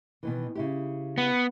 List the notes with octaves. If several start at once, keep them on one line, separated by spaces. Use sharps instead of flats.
B2 D#3 E3
C#3 E4 G4
B3